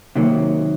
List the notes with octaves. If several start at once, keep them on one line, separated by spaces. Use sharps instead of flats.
C3 D#3 F#3 A#3